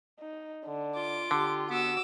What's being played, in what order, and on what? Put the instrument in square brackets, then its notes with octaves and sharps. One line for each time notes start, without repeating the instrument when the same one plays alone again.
[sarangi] D#4
D3
[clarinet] F4 [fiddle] D6
[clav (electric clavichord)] D3 [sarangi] G4
[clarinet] B3 [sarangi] F#4 [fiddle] D6 E6